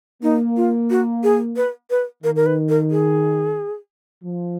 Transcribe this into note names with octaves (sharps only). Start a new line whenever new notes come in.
A#3 D#4
F4
F#4
G#4
B4
B4
D#3 A#4
A#4
B4
A#4
G#4
F3